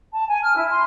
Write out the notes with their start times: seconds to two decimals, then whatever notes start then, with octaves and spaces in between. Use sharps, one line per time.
0.14 A5
0.29 G#5
0.43 F6
0.55 E4
0.70 C6